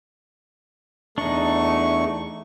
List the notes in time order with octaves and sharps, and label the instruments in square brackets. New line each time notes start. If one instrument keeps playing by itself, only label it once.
[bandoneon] E2 C#6 [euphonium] A3 [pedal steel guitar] D4 D#4